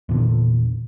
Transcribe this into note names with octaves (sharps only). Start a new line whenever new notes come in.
E2 A#2 D3